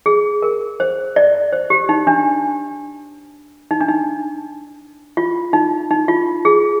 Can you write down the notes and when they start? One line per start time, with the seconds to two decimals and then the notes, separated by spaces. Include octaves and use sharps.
0.06 G#4
0.42 A#4
0.80 C5
1.16 D5
1.52 C5
1.70 G4
1.89 D#4
2.07 D4
3.71 D#4
3.81 D4
3.89 D#4
5.17 F4
5.53 D#4
5.91 D#4
6.08 F4
6.45 G#4